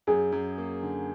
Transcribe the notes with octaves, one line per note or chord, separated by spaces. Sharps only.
F#2 G#4
F#2
A#3
D3